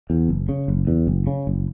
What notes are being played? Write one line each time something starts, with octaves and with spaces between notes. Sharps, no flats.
E2
F#1
C#3
F#1
E2
F#1
C#3
F#1